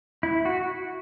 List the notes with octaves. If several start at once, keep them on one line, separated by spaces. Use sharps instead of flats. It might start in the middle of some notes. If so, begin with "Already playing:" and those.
E4
F#4